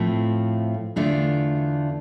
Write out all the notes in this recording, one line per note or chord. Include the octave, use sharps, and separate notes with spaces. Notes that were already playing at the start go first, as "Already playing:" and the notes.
Already playing: A2 F3 A3 C4 F4
E2 D3 A3 D4 F4